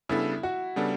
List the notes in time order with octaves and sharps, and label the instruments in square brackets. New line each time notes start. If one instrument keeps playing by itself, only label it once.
[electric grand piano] C#3 G3 B3 D4 A4 [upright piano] E4
[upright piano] F#4
[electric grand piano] C#3 G3 B3 D4 A4